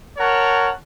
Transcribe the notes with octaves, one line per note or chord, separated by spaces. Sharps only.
A#4 C#5 F#5 A5